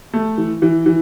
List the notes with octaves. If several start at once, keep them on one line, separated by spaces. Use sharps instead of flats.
A3
E3
E3
E3